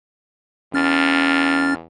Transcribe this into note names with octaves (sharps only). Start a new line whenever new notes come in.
E2 C#4 F6 A6